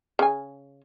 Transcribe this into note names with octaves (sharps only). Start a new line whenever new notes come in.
C#3 G#5